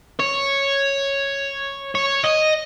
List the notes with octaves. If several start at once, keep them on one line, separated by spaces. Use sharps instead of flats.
C#5
C#5
D#5